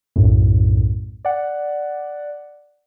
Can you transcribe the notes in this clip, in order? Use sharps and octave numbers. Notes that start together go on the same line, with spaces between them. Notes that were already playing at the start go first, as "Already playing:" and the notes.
B1 F#2 A2
D5 F#5